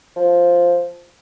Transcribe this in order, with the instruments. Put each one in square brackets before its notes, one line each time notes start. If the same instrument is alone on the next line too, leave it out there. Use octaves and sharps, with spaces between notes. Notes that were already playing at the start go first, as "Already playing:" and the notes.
[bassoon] F3